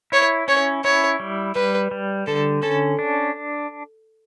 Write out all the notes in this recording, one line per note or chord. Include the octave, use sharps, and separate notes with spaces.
E4 C#5
C#4 C#5
E4 C#5
G3
G3 B4
G3
D3 A4
C#4 A4
D4